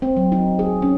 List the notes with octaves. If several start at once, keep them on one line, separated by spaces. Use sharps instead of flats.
C4
F#3
D#4
G#4
C#4